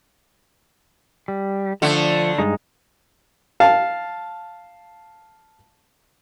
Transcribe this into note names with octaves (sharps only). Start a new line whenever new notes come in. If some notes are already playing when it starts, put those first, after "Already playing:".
G3
D3 F3 A3
G2 G#3 D#4
F5 A5